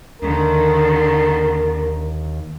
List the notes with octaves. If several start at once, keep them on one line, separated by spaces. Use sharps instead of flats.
D#2 D3 D#3 A#4